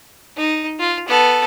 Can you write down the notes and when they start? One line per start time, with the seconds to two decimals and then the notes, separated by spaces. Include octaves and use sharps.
0.37 D#4
0.79 F4
1.08 B3 A4